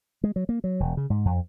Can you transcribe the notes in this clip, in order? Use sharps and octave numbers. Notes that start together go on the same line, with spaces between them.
G#3
F#3
A#3
F#3
E1
C#3
G#2
F2